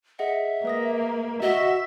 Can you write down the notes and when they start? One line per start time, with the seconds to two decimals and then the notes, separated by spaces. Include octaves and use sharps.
0.19 G#4 D#5 E5 F#5
0.65 A#3 B4 D#6 A#6
1.42 F#4 D#5 E5